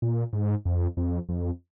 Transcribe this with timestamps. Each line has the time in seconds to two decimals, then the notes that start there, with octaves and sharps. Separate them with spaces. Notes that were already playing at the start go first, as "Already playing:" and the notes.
0.02 A#2
0.33 G#2
0.65 F2
0.97 F2
1.29 F2